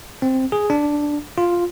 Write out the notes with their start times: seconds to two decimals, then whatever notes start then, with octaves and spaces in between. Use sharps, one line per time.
0.22 C4
0.52 G#4
0.70 D4
1.38 F4